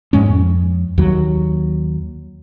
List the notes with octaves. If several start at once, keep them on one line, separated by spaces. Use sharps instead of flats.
G#2 G#3 C#4
F2
D#2 F#3